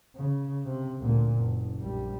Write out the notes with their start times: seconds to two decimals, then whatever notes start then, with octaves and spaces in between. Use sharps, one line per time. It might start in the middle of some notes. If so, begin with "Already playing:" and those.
0.16 C#3
0.66 C3
0.99 D2 A#2
1.33 F#1
1.80 A#1 G3